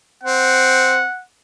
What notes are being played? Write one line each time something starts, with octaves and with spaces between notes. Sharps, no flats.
C4 F#5